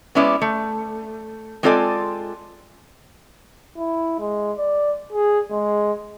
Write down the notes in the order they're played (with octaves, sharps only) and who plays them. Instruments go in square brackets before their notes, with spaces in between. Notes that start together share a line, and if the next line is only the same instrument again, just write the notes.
[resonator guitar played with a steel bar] G#3 B3 C#4 E4 B4 D5
A3
G#3 C4 F4 A4 D5 G#5
[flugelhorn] E4
G#3
D5
G#4
G#3